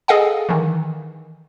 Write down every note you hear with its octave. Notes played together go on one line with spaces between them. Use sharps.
G#4 A4 D#5 F5 F#5 G#5
D#3 E3